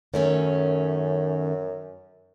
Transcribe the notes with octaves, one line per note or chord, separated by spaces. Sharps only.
F#2 D#3 A3 C#4